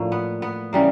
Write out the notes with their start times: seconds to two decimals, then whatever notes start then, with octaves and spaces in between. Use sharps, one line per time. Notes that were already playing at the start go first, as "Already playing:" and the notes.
Already playing: A2 F3 A#3 D4
0.12 B3
0.42 B3
0.73 C#3 E3 G3 A#3